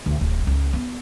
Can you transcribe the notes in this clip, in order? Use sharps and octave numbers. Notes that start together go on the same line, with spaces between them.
D2
D1
C#2
B3